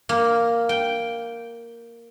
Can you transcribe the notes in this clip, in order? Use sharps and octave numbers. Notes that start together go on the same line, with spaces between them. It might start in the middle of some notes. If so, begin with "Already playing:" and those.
A#3
G5